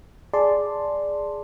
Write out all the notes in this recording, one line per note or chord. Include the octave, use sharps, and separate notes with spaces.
G#4 D5 A5 C6